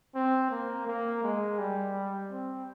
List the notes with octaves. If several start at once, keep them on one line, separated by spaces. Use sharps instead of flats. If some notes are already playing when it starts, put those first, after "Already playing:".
C4
A#3
A#3
G#3
G3
C4